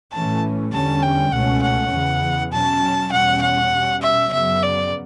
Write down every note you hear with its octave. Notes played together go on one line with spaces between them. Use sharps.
A2 E3 A3 C#4 A5
E2 D3 G3 C#4 A5
G5
C#2 B2 A3 C#4 F#5
F#5
E2 C#3 E3
B2 F#3 C#4 A5
E2 B2 G3 C#4 F#5
F#5
B2 G3 C#4
E5
F#2 C#3 F#3 B3 E5
D5